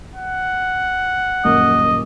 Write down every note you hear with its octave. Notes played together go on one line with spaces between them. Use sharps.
F#5
D#1 F#2 A#3 D#5